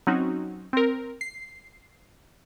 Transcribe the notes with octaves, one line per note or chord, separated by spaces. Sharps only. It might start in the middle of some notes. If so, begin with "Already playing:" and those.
F#3 C4 C#4 D#4 F#4
C4 A#4
C7